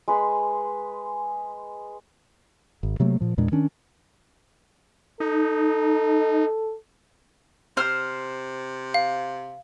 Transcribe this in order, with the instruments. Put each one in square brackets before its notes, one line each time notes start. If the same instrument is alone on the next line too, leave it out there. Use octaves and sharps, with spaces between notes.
[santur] G#3 B4 C6
[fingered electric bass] G#1
C3 F#3 A3 A#3
A#2 F3
E2 A#2 G#3 D4
D#3 C#4 D4
[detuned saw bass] D#4 [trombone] A4
[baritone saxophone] C3 [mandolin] C5 F6
[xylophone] F5